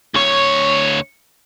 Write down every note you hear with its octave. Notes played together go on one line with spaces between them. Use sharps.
D2 C#5